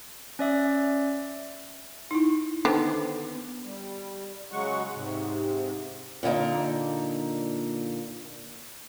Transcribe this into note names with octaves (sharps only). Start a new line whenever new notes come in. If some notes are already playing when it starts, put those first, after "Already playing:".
C#4 D5 E5
D#4 E4
D3 D#3 B3 C5 F#5 A5
G3
C#3 F#3 G#3 F#5 C#6
G#2 C3
A#2 D3 A#3 D#4